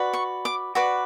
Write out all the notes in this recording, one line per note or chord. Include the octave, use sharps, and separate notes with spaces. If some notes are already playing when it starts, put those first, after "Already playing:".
Already playing: F#4 B4 D5
C#6
D6
F#4 B4 D5 D6